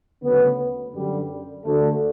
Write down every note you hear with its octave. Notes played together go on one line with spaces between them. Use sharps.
D2 C#3 F#3 B3
F#2 D3 G3
D2 D3 A3